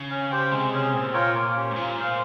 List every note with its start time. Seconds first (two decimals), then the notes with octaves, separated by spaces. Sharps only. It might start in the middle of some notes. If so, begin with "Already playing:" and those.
Already playing: C#3
0.10 C#4
0.31 G4 C5 G5
0.51 C3 G#3
0.72 C#4 G#4
0.93 A#2 C4
1.14 F4 A#4 C#5 G5
1.35 A#3
1.56 C#4 G4 C5
1.71 G#2
1.76 A#2 F4
1.98 C5 F5